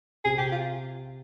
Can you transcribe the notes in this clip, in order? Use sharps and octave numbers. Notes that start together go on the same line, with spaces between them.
C3 G#4
G4
F4